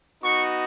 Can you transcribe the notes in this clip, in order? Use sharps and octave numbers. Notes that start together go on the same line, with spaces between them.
B3 D#4 F#4 C#6